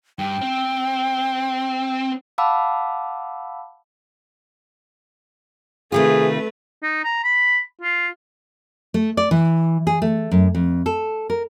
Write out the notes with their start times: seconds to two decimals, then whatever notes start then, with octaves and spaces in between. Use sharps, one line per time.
0.19 G2 G5
0.41 C4
2.38 F5 F#5 A5 B5 D6 E6
5.92 C3 D#3 A3 F4 G#4 B4
6.83 D#4
7.04 A#5
7.24 B5
7.82 F4
8.94 A3
9.17 D5
9.31 E3
9.87 G#4
10.02 A3
10.31 F#2
10.55 F2
10.86 A4
11.30 A#4